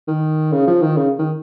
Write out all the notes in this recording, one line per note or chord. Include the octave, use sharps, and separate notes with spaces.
D#3
C#3
F3
D#3
C#3
D#3